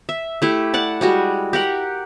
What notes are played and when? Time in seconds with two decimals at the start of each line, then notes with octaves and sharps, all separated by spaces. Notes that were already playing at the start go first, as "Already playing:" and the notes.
0.09 E5
0.42 A3 E4 G4
0.74 D5 F#5 A5
1.01 G3 G#3 F#4
1.53 G4 A#4 F#5